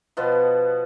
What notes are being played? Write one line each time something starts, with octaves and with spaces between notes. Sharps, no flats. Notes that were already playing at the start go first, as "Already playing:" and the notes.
B2 F3 B3